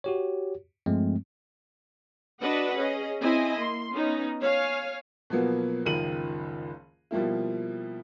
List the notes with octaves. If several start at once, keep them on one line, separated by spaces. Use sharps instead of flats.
F#4 G4 C#5
G2 F3 G#3 A3 C4
D4 F#4 B4 D#5 F#5
C#4 G#4 D#5
C4 E4 D#5 G#5
A#3 C6
B3 C#4 D#4
C#5 F5 G#5
B2 F3 F#3 A#3 B3
F#1 C#2 D#3 F3 D#7 F#7
B2 F3 G3 A#3 E4